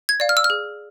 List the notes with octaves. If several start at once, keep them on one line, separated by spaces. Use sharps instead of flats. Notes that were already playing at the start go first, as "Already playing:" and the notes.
G#6
D5 F5
F6
E6
F6
G#4